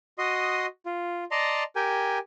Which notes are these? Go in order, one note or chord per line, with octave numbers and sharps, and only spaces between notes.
F#4 D#5 C6 D#6
F4
D5 D#5 A5 A#5 C6
G4 A#4 G5 G#5